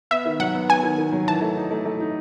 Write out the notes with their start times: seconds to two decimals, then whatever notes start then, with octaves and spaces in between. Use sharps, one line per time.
0.11 B3 E5
0.25 D#3
0.39 F#3 F#5
0.54 B3
0.69 B3 G#5
0.83 D#3
0.98 D#3
1.13 F#3
1.27 E3 A5
1.42 A3
1.56 D#4
1.71 A3
1.85 A3
2.00 D#4